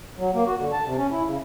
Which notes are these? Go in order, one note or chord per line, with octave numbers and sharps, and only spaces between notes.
F#3
A#3
F#4
D3
A5
C3
C#4
E4
C#3